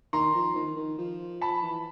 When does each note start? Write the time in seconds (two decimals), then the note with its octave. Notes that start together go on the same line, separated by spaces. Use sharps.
0.13 D#3 A#5 C6
0.35 F3
0.55 D#3
0.77 D#3
0.98 F3
1.41 A5 B5
1.62 E3